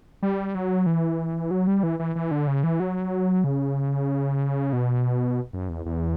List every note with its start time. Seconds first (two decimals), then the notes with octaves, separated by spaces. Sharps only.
0.22 G3
0.55 F#3
0.86 E3
1.51 F#3
1.67 G3
1.83 E3
1.99 E3
2.15 E3
2.31 D3
2.47 C#3
2.64 E3
2.80 F#3
3.44 C#3
4.73 B2
5.53 F#2
5.69 E2
5.86 E2